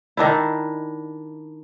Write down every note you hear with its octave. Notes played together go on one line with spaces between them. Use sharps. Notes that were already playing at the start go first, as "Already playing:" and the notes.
D#3 D4 E4